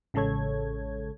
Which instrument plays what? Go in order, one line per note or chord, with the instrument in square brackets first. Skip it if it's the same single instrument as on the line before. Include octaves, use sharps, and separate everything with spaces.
[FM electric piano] A1 C#3 G#3 A4 C#5 G#6